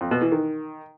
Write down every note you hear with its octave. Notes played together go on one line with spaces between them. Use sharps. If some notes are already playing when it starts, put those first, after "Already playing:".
F2
B2
E3
D#3